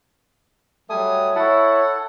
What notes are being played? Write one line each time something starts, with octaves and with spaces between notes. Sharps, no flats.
F#3 G3 A3 G#5 D#6
E4 A4 C#5 F#5